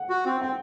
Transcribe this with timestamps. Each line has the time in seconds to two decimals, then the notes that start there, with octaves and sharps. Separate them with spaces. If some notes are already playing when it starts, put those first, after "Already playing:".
Already playing: F#5
0.09 F#4
0.25 C4
0.41 C4 G5